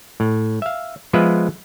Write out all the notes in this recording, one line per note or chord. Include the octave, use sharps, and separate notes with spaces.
A2
E5 F5
F3 G#3 B3 F4 B4 E5